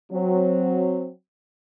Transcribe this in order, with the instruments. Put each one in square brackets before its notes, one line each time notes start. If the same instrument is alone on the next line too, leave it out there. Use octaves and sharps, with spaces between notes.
[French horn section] F#3 C4